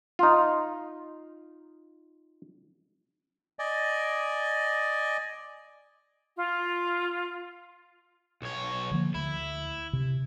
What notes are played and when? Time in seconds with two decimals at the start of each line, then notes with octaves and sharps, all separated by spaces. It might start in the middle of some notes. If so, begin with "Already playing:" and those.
0.19 D#4 F4
3.59 D5 D#5 G#5
6.38 F4
8.42 B1 C#5
8.91 D3 F3 A#3
9.15 D2 E4
9.93 C3